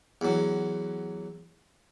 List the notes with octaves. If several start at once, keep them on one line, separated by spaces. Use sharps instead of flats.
E2 F#3